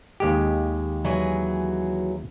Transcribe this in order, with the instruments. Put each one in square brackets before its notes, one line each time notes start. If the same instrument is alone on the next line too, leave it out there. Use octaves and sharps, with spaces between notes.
[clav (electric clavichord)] D#2 G#3 G4
[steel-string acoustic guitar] E3 F#3 G#4